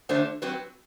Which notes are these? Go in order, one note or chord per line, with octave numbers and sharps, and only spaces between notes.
D3 A3 D4 F#4 C5
F#3 C4 F#4 B4